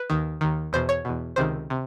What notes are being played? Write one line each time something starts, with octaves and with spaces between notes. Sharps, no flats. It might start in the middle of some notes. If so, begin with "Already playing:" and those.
Already playing: B4
D#2 D#3
D#2 D#3
E2 B2 C5
C#5
E2 B2
C#2 C3 D#3 C5
C3